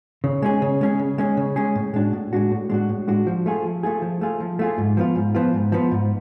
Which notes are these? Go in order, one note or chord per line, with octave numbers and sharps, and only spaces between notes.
C#3
G#3 C#4 G#4
C#3
G#3 C#4 G#4
C#3
G#3 C#4 G#4
C#3
G#3 C#4 G#4
A2
G#3 D4 F#4
A2
G#3 D4 F#4
A2
G#3 D4 F#4
A2
G#3 D4 F#4
F3
A3 F4 G#4
F3
A3 F4 G#4
F3
A3 F4 G#4
F3
A3 F4 G#4
G#2
F3 B3 F4
G#2
F3 B3 F4
G#2
F3 B3 F4
G#2